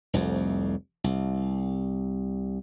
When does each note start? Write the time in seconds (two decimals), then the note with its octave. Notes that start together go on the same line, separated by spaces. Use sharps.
0.13 F1 C2 F2
1.04 C2